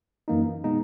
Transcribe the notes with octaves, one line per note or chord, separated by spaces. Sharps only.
F#2 E3 A#3 D#4
B2 G#3 B3 D#4